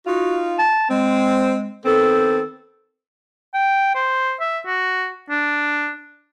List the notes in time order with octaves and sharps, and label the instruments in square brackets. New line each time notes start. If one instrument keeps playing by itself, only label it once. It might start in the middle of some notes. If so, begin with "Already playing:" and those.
[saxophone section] D#4 F4 [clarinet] F#4
[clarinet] A5
[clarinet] G#3 [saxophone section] C4
[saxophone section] D#3 B3 C4 [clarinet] A4
[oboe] G5
C5
E5
F#4
D4